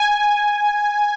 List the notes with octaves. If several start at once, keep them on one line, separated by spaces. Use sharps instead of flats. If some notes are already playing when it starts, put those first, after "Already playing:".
Already playing: G#5